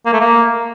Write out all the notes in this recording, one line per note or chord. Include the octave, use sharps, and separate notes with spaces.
A#3
A3
A#3